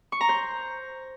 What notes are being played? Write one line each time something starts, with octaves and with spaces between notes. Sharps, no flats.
C#6
A#5
C5